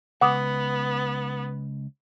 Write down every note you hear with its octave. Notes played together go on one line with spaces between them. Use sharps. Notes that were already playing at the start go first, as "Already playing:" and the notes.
C#2 B3 F#5 D6 D#6